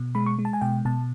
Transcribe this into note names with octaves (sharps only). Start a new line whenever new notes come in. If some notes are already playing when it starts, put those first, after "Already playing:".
Already playing: B2
G#3 B5
C#6
G#3
A5
G#5
B2 G5
B2 A5